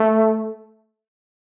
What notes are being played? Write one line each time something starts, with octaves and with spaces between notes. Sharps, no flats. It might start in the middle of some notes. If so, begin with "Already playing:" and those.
Already playing: A3